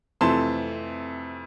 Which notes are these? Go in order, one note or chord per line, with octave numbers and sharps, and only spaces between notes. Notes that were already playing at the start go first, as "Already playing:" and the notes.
F2 C3 E3 A3 A5 C6